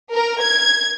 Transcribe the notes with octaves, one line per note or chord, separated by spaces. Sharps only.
A#4
G#6